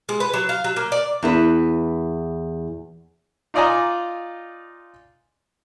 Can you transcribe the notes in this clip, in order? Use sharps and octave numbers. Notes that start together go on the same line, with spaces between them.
G#3
B4
F#3
F5
F#3
A#3
D5
E2 E4 B4
D#4 F4 D5 D#5 G#5 A#5